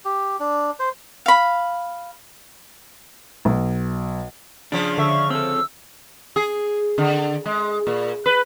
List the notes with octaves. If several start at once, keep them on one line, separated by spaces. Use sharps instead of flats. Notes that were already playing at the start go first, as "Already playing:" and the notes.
G4
D4
C5
F5 B5
B1
C#3 F3 D4
D3 E5 C#6
C4 A4 E6
G#4
D3
G#3
A#2
B4